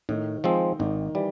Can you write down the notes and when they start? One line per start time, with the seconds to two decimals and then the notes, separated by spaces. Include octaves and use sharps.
0.09 A2 D#3 D#4
0.44 F3 G#3 C4
0.79 G#1 D#3 D#4
1.15 E3 G3